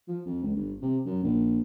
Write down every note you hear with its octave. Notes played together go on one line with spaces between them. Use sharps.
F3
F2
C#2
G1
C3
F#2
A#1